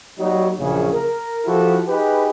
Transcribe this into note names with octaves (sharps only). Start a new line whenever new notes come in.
F#3 G3 A#3 D#4 F#4
A#1 F#2 C#3
A#4
F3 E4 F#4 G4 A4
D#4 G4 G#4 B4